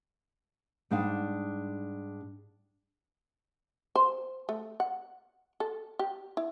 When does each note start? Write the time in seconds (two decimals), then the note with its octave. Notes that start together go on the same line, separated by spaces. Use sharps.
0.91 G#2 G3 D4 D#4 F5
3.96 C5
4.49 A3
4.80 F#5
5.60 A4
5.99 G4
6.37 E4